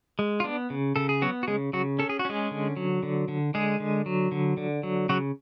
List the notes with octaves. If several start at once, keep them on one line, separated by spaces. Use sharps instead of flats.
G#3
F4
B3 D4
C#3
C#3 A4
G#4
F#3 B3 F#4
F#4
C#3 G#3 G#4
C#3 F#3 F#4
C#4 A4
G#4
F#4
G#3 C#4 G#4
D3
F#3
D3
D3
D3 G#3 G#4
D3
F#3
D3
D3
F#3
C#3 F#3 F#4